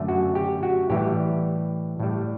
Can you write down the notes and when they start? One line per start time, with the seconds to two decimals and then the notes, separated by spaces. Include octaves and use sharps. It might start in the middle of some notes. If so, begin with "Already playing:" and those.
Already playing: F#2 D3 A3
0.08 F#4
0.35 G4
0.63 F#4
0.90 A2 E3 G3 G4
2.00 A2 G3